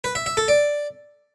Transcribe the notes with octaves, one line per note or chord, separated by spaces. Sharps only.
B4
E5
E5
A4
D5